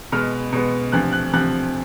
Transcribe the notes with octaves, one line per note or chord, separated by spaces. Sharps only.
B2 G#3 B3 F6
B2 G#3 B3
D2 C3 F3 F#6
F#6
D2 C3 F3 F#6